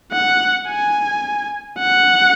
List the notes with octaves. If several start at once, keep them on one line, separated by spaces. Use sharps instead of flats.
F#5
G#5
F#5